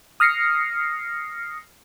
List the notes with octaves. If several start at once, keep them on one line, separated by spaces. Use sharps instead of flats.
D#6 F6 A#6 C7 C#7